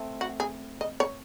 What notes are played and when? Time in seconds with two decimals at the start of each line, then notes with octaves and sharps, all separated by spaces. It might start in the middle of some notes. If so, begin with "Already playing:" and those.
Already playing: A3 C4
0.21 F#4
0.40 G#4
0.81 D#5
1.00 C#5